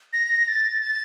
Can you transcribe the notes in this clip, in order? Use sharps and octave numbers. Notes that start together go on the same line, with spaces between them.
A#6
A6
A6